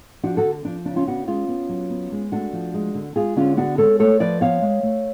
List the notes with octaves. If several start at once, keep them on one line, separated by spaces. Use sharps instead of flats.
F3 D4 F#4
F#4 A4
D3
F3 D4
C#3 D4
C#4 F4
B3 D4 F#4
G#3 C#4 F4
B3
F#3
B3
G#3
A3 D4 F#4
F3
G#3
D3
G#3 F4 G#4
D3 C#4 F4
B3 D4 F#4
G#3 A4 C#5
A3 A4 C#5
F3 B4 D5
B3 C#5 F5
G#3
A3